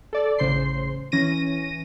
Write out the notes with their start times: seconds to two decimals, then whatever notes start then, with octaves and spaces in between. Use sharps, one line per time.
0.13 A4 D5
0.38 A1 C#3 C5 C6 C7
1.12 E3 C#4 A#6 D#7